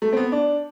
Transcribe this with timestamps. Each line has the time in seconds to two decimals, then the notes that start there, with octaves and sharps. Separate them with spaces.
0.02 A3
0.13 C4
0.17 B3
0.32 D4